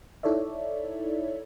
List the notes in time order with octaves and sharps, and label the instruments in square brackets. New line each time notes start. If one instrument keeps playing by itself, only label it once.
[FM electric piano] D#4 E4 A4 C#5 D5 E5